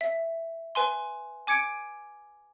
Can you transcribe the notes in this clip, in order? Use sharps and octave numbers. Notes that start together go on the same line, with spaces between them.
E5
B4 G#5 C6
G#5 D6 G#6 C#7 D7